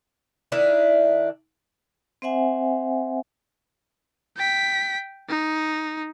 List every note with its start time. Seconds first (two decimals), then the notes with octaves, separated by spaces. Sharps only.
0.52 D#3 D4 E4 E5
2.22 C4 C5 E5 F#5 G#5
4.37 G5 B6
5.29 D#4